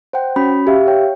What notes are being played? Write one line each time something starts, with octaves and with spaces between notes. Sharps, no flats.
C5 F#5 G5
C#4 F#4 B5
G4 E5 F5
C#5 G5